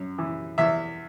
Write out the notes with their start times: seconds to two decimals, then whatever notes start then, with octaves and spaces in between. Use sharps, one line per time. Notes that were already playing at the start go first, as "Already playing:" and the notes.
Already playing: F#2
0.18 E3
0.58 E2 E5